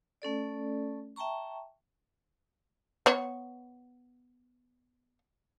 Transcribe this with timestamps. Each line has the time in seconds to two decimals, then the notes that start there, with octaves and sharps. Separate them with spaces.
0.22 A3 C#4 A4 D5
1.16 E5 G5 A5 A#5 C#6
3.06 B3 C#5